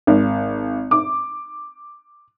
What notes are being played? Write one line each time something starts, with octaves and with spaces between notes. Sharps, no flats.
G#1
D6